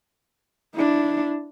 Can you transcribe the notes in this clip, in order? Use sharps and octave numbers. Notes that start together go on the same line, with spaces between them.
D4 E4